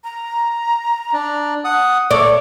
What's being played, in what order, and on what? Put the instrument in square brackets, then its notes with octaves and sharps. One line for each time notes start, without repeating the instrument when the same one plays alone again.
[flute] A#5
[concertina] D4
F#5 D#6
[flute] A4 [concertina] C#5 [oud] D5